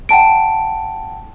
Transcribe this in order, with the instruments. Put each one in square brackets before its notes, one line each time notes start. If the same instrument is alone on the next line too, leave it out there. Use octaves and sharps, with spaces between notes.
[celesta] F#5 G5 A5 D7